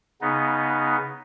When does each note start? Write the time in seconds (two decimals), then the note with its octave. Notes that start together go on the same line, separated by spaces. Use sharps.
0.21 C#3 B3 D#4